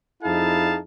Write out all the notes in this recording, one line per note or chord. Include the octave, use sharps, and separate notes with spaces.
F2 D#4 E4 G#4 F5 A5